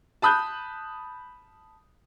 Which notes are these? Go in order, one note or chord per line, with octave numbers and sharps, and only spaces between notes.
A5 B5 D#6 F#6 G6